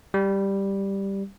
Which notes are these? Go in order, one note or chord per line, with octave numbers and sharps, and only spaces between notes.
G3